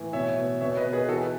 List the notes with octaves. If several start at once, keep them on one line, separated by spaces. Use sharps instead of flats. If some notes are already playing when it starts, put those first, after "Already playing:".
Already playing: A2 E3
B2 C#5 E5
B2
B2 C#5 E5
B4 D#5
B2
G#4 B4
E3 F#4 A4
B4